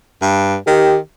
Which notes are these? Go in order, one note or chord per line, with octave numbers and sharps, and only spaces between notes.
G2
D#3 G4